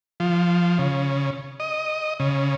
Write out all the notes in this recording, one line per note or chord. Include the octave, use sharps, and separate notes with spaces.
F3
C#3
D#5
C#3